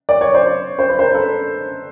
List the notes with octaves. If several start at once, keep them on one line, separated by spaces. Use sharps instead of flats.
D5
C#5
C5 D5
C5
B4
A#4 C5
A4 B4